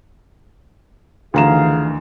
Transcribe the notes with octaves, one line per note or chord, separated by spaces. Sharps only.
D2 D#3 E3 F4 G#4 F5 A#5 E7